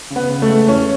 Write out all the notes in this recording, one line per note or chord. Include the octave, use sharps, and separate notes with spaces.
C#3
B3
C#3
A3
G#3
E2 C#4